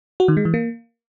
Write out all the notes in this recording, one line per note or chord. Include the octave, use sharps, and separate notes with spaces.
F#4
D#3
G#3
E3
A#3